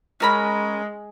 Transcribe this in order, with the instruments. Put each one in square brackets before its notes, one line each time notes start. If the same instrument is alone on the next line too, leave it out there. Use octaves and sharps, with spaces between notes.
[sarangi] G#3 [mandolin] C#4 A#4 B5